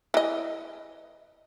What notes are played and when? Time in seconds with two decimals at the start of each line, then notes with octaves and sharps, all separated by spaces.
0.14 E3 D#5